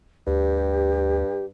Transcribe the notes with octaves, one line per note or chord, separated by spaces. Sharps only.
D2 G2 G4